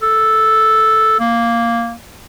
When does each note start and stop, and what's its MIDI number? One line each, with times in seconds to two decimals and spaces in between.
0.02 1.18 69
1.20 1.96 58